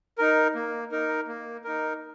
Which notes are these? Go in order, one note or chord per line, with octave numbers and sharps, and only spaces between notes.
D#4 A#4
A#3
D#4 A#4
A#3
D#4 A#4